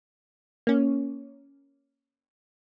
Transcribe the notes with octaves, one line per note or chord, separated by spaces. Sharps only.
A#3 C#4